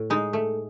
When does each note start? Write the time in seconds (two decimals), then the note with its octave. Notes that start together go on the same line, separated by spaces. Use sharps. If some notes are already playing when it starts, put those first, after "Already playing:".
Already playing: A2
0.10 G#3 D#4
0.33 A3